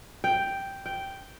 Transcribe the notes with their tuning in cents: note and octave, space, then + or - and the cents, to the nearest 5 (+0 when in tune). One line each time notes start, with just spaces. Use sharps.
G5 +0
G5 -5